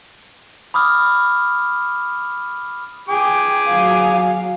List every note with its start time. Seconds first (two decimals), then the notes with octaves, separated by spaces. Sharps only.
0.74 B5 D6 D#6 F6
3.09 G#4 G5 D6
3.66 F#3 F5